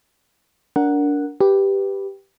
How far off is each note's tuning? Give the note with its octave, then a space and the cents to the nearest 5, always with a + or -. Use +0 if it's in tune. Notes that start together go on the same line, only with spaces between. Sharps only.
D4 -25 A#4 +0 F#5 +0
G4 +0 B4 +0